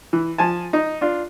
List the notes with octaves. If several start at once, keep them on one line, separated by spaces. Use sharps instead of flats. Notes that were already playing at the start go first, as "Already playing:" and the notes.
E3
F3 G#5 A5
D#4
D4 F4